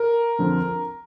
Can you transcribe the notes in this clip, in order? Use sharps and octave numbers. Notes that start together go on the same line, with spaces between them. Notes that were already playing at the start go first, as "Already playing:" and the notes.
Already playing: A#4
F2 D3 F3